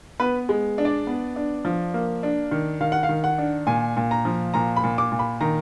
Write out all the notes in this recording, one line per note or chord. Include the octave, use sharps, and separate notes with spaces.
B3 B4
G#3
D4
D5
B3
D4
F3
A#3
D4
D#3
D#3 F5
F#5
F5
D#3
F#5
D4
A#2 G#5
A#2
A#5
F3
A#2 A#5
B5
A#2
D6
A#2
B5
D#3 A#5